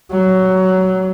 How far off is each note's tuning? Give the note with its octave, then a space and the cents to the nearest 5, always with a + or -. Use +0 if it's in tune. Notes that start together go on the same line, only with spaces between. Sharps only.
F#3 +15